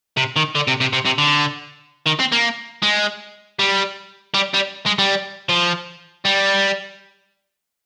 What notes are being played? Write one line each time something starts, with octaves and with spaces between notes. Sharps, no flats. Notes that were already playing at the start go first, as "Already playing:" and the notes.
C3
D#3
D3
C3
C3
C3
C3
D3
D#3
C4
A#3
G#3
G3
G3
G3
G#3
G3
F3
G3